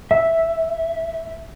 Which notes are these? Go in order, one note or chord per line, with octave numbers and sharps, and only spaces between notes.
E5